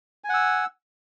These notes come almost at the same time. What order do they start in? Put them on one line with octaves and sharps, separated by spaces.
G#5 F#5 E6